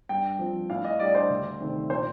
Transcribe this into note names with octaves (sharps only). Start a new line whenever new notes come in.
G2 G5
F3 C4
A2 F5
D#5
G3 D4 D5
C5
D2
C3 D#3 A3 C4
A#2 C5